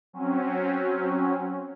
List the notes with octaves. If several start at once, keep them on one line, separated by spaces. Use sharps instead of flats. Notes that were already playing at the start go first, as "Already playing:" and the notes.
F#3 C4 C#4